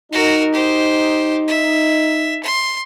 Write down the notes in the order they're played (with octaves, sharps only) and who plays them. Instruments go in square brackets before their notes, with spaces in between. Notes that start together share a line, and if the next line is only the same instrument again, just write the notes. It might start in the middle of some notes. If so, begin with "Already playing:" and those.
[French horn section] D#4 [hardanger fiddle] F#4 A#4
[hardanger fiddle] G4 C5
E5
C6